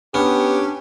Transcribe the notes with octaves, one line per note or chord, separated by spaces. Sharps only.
B3 C#4 D4 G4